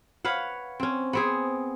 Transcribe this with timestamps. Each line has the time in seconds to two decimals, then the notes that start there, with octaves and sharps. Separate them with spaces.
0.25 B4 C#5 F5 F#5
0.80 C4 C#4
1.13 B3 C4 G#4